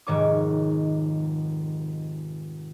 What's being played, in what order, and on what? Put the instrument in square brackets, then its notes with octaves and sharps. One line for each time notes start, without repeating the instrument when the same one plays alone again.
[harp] F1 G#2 D#3 C#5 D6